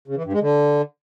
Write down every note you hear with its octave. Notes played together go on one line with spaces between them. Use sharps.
C#3
E3
G2
G#3
D3